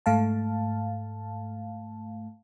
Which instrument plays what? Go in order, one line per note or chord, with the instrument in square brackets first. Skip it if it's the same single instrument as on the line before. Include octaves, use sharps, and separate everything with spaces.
[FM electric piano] G#2 A3 F5 A5